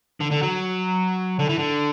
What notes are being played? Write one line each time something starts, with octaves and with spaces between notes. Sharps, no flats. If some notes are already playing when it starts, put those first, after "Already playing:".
D3
D3
F#3
D3
E3
D3